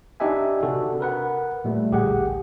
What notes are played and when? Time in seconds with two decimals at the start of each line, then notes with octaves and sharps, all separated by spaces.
0.20 D4 D#4 G4 D#5 E5 G#5
0.63 C3 D4 F#4 A4
1.00 A#4 B4 F#5
1.64 A#2 G3 A3
1.92 A1 D2 G4 G#4 F#5